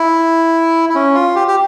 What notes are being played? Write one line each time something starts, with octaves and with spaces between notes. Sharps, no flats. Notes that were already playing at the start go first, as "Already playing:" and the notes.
Already playing: E4
E4
C#4
F4
G4
G4